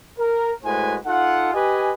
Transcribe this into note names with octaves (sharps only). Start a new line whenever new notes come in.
A#4
A2 G#3 F#4 B4 C5 G#5
D#4 F4 A4 F#5
G4 B4 D#5 G#5